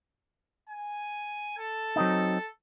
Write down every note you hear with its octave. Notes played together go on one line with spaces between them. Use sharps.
G#5
A4
F#3 C4 D#4